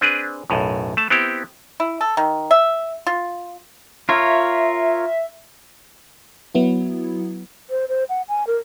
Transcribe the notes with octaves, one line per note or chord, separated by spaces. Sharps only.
C4 D4 G#4 B4
B1 F#2 A2
A3 A5
B3 C4 E4 G4
E4
A4
D#3
E5
F4
F4 A#4 C#5 E5
F#3 B3 E4
C5
C5
F#5
G#5
A#4